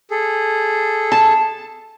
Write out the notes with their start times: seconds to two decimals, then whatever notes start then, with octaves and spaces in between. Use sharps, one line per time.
0.11 G#4 A4
1.12 A5